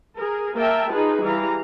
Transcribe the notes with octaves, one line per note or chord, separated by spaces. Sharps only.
G#4 A#4
A#3 A#4 E5 G5 A5
D#4 F4 G#4 B4
E3 G3 F5 A#5